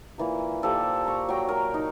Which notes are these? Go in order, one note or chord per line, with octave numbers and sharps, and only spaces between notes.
A#2 E3 A#4
A#2 G4 A4 C5
A#5 C#6
F#3 G5 A#5
A#4
D#4